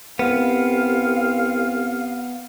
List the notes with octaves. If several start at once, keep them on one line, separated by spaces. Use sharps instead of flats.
C2 B3 C4 F5